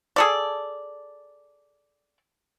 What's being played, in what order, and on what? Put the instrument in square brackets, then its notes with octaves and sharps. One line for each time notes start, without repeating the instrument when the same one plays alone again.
[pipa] G#4 A4 D5